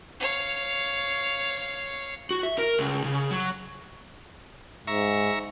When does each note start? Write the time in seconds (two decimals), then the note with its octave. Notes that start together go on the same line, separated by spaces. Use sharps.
0.20 C#5 F5
2.31 F#4
2.43 E5
2.58 A#4
2.79 C#2
3.04 C#3
3.31 F#3
4.87 G#2 E5 A#5 C#6